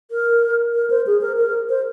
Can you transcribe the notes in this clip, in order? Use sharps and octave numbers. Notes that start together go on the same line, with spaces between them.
A#4
A#4
C5
G#4
A#4
A#4
C5